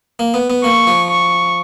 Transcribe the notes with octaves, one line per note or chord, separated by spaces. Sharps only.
A#3
B3
B3
A#3 C#6
F3
C#6